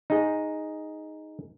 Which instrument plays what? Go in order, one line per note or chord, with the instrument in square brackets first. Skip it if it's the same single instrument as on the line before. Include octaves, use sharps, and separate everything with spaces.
[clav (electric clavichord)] D#4 G#4